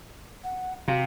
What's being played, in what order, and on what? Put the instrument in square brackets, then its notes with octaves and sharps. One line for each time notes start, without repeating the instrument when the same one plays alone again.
[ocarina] F#5
[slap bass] C3 [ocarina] F#4 [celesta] F5